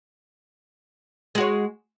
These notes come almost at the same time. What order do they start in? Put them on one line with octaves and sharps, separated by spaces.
G#3 F#4 C#5